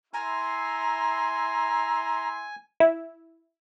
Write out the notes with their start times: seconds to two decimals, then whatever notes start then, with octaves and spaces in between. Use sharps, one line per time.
0.14 E4 G#5 A#5 C6
2.80 E4